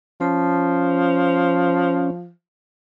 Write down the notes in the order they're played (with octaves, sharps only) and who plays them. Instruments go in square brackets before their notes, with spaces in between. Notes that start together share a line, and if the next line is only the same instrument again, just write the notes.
[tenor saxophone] F3 [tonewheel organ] C#4